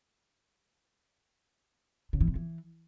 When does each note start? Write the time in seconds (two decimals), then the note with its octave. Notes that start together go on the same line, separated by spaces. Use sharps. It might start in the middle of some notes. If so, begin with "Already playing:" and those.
2.13 C#3
2.21 E3
2.28 C3
2.35 E3